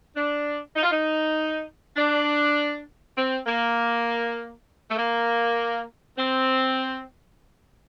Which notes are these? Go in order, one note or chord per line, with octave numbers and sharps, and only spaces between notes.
D4
D#4
F4
D#4
D4
C4
A#3
A3
A#3
C4